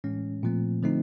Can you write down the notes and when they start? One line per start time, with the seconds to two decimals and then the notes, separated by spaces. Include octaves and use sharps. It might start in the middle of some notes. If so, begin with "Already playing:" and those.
0.04 A2 E3 G#3 C#4
0.43 A#2 F3 A3 C4
0.83 D3 F3 A3 C4 D#4